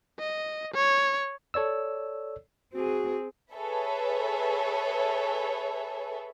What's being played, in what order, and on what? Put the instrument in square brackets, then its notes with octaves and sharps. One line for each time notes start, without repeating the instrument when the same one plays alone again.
[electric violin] D#5
C#5
[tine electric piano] A4 C#5 D5 E6
[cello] C4 G#4 [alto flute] F#4
[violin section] G#4 A4 B4 C#5 E5